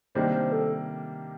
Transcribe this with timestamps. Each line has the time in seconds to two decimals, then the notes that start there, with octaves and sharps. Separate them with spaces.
0.15 C3 D#3 G3 A#3 D4 C5
0.34 C5
0.52 A4